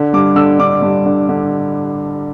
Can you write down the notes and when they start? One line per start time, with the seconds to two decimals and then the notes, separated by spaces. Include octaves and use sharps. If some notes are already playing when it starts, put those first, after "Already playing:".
Already playing: D3
0.13 G2 D6
0.36 D3 E6
0.59 D3 D6
0.82 G2
1.06 D3
1.29 D3